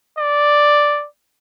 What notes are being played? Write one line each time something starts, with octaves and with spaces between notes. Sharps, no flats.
D5